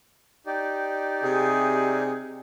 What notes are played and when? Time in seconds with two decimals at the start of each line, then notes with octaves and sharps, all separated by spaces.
0.46 D#4 G4 D5
1.23 C3 G#4